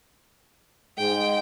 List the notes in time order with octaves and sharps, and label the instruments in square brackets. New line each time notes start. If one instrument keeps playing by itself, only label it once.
[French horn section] G#2 G#3 [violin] G5